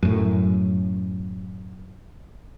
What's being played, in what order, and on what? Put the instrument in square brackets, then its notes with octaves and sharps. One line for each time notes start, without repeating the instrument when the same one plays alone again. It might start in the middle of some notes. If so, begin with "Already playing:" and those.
[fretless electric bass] F#2 A2